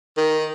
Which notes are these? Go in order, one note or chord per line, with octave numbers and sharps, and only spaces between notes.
D#3